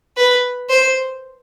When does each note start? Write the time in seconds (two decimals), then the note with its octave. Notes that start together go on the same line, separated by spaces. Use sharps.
0.17 B4
0.70 C5